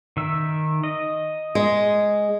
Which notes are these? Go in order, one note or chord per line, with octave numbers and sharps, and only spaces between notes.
D#3 E5
D#5
G#3